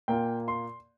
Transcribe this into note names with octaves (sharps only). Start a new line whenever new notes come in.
A#2 A#3 F4 G5
C6